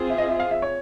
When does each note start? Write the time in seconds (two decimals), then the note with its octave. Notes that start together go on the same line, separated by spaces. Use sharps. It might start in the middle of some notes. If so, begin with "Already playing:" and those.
Already playing: C4 F4 G#4
0.10 E5
0.18 D#5
0.29 E5
0.40 F5
0.51 E5
0.62 C#5